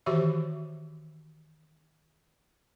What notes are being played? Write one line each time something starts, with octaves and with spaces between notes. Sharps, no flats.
D#3 E3 F#4 G4 C5 E5